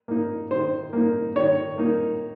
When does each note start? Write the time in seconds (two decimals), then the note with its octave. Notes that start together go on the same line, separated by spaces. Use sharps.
0.08 A#3 D#4
0.51 D#3 C5
0.93 A#3 D#4
1.36 D#3 C#5
1.78 A#3 D#4